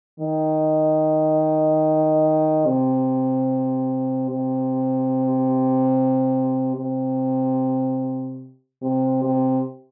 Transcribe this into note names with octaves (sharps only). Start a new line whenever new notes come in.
D#3
C3
C3
C3
C3
C3